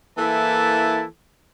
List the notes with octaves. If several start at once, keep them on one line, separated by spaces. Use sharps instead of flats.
E3 A#3 E4 A4 A5